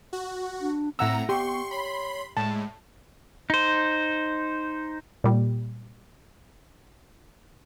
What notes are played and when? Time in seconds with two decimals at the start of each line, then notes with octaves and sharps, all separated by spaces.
0.13 F#4
0.61 D4
0.99 A2 C4 E5 F#5 A#5 E6
1.29 B3 G4 C6 C#6
1.71 C#5 B5 C6
2.37 A2 G#3 A5
3.50 D#4 C5
5.24 A#2 G3